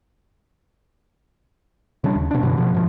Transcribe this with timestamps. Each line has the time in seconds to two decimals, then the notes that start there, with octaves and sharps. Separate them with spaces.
2.04 C#3 G3 D4
2.15 D#2
2.31 B2 D4
2.43 F#2 B2 D3 E3
2.57 B2 F3
2.74 G#2 F3